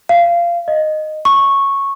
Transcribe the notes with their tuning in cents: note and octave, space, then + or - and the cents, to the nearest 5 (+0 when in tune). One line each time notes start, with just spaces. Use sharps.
F5 -20
D#5 -10
C#6 -10